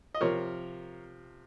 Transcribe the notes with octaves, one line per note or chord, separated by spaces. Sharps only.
D#5
C3 F3 A#4 C#5